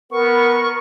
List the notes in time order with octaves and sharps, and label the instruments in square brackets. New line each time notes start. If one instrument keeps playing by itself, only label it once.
[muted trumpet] B3 [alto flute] A#4 [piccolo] C#6